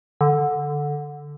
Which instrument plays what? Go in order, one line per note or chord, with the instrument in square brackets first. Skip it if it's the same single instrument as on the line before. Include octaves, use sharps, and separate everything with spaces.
[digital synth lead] D3